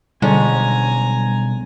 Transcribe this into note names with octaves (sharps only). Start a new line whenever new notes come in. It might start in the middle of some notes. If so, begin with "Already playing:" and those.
B1 D3 G3 G#3 C#4 G#5 A#5